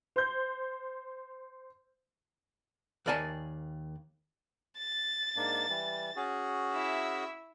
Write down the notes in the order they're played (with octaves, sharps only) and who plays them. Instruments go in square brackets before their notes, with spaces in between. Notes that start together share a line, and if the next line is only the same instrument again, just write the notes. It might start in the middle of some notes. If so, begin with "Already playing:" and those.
[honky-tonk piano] C5 G6
[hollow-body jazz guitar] D#2 A#4 D5 G#5 A5
[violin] A6
[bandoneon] G#2 A#3 D4
E3 G3
C#4 F#4 G#4
[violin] E4 E5